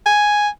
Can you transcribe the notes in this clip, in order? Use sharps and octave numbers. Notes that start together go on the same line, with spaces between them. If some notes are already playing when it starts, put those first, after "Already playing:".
G#5